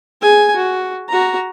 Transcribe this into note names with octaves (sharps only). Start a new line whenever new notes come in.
G#4 G#5
F#4
F#4 A#5